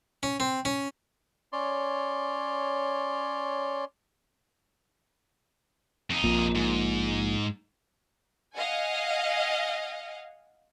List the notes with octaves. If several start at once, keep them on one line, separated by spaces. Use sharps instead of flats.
C#4
C4
C#4
C#4 C#5 D5 C6
F2 D#4
A#1 A#2
G#2
D#5 F5 F#5 G#5